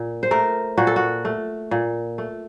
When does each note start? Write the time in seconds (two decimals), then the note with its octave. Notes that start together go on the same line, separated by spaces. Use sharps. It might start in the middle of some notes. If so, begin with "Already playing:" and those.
Already playing: A#2
0.23 C5
0.31 A3 A#4
0.78 A#2 F#4
0.87 A4
0.96 F#4
1.25 A3
1.71 A#2
2.18 A3